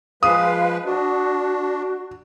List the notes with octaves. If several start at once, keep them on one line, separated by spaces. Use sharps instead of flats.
F3 G#3 B4 F5 D#6
D4 F#4